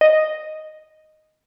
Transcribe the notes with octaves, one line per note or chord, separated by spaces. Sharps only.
D#5